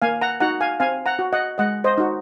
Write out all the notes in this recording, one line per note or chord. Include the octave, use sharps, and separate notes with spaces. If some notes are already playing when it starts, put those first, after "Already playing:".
A#3 F5 G#5
F#5 A#5
D#4 F#4 F#5 A#5
F5 G#5
C4 F5 G#5
F#5 A#5
F#4
D#5 F#5
G#3 D#5 F#5
C5 D#5
D#4 F#4